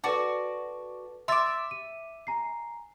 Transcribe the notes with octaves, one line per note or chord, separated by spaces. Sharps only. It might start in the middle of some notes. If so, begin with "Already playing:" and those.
F#4 A4 B4 D5 A5
E5 C6 D6 E6 A6
D#7
G#5 A#5 C7